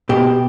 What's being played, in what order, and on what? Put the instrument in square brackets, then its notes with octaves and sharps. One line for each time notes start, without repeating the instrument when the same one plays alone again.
[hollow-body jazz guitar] B2 G4